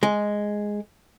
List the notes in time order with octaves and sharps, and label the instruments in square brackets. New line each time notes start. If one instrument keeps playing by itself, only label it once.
[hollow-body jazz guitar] G#3